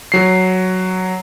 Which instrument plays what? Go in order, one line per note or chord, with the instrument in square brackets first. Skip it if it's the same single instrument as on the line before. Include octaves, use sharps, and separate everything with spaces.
[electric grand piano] F#3 C7